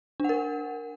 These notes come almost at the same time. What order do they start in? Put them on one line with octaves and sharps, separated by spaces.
D4 F#5 A#4